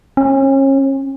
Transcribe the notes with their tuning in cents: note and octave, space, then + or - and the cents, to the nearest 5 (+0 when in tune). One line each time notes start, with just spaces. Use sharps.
C#4 -35